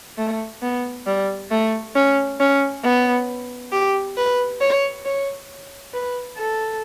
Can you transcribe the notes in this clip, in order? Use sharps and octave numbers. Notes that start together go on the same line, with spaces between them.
A3
B3
G3
A3
C#4
C#4
B3
G4
B4
C#5
C#5
B4
A4